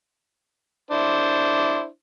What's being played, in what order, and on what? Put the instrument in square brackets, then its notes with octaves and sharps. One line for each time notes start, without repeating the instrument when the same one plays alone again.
[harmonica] D4 E4 C5